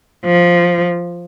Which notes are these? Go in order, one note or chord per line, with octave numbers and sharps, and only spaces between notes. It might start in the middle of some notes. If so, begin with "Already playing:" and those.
F3